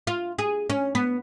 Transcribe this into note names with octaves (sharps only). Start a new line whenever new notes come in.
F4
G#4
C#4
B3